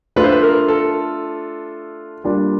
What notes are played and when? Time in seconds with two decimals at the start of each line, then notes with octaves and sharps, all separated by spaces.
0.16 A3 D4 F4 B4
0.24 C5
0.32 B4
0.43 A#4
0.68 A4
2.24 G3 A#3 D4 F4